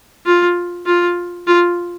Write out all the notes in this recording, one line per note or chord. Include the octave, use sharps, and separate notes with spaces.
F4
F4
F4